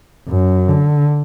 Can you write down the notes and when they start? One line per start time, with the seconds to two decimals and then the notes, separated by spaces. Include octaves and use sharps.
0.29 F#2
0.69 D3